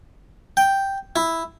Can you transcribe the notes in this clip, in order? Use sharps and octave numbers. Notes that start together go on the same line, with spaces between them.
G5
E4